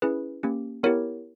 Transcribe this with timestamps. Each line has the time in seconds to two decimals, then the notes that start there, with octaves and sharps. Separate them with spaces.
0.02 C#4 E4 G#4 B4
0.43 A#3 C#4 G4
0.83 B3 E4 G4 A#4 C#5